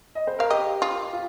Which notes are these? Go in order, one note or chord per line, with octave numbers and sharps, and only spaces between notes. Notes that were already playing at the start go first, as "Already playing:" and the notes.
D#5
C5
A#4 F5
G4 D#5
F4
F4